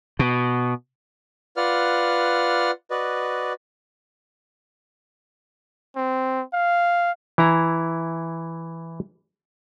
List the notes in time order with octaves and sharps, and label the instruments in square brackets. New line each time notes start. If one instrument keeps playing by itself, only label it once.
[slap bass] B2
[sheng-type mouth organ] F4 B4 D5 F#5 F6
F#4 B4 D5 D#5
[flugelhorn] C4
F5
[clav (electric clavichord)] E3 E4 A#5